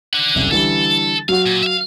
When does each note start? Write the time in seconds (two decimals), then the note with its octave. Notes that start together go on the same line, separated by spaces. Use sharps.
0.13 D4 F#5
0.35 F#1 C2
0.51 D3 E3 G3 A4
1.29 F#3 F#4 F5
1.46 A#2
1.63 E5 F5